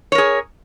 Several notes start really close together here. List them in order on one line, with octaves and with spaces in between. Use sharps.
C#5 A#4 G#4